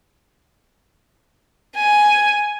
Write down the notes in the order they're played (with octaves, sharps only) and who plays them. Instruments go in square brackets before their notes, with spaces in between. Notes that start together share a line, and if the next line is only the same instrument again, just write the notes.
[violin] G#5